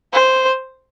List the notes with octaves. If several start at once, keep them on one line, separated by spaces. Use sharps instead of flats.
C5